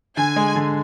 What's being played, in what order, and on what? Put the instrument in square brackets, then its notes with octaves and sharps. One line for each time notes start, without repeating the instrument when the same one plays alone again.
[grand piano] D3 [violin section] G#5
[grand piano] G#3
D3